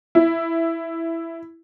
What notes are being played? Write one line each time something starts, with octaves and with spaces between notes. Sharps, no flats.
E4